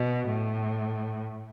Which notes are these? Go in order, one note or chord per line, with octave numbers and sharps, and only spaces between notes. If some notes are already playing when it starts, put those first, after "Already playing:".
Already playing: B2
A2